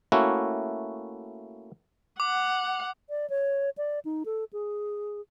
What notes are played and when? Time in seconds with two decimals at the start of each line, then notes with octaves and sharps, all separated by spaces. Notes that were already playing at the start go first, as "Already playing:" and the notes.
0.12 A3 A#3 C#4 E4 F#4
2.20 F#5 D6
3.10 D5
3.30 C#5
3.77 D5
4.05 D#4
4.26 A4
4.53 G#4